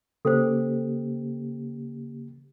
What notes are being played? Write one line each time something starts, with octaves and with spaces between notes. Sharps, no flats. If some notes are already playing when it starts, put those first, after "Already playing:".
C#3 A#3 G4 A4 C5